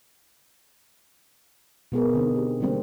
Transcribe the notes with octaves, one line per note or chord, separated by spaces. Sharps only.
B2 B3 G#4 A#4
D3 C4 D#4
G4
D3 E3 G3 A#3 C4